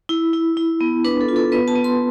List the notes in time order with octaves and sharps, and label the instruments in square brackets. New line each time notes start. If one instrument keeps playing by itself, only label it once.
[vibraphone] E4
E4
E4
B3
D4 B4
A4
F4
A4
B3 B4
A5
B3
C6